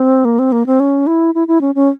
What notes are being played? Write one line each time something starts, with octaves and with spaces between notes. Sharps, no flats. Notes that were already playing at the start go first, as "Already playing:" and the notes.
Already playing: C4
A#3
C4
A#3
C4
C#4
E4
E4
E4
C#4
C#4